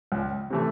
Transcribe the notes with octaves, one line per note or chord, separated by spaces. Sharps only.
C#2
C3 E3 A3